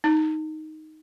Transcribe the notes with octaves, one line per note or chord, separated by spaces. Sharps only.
D#4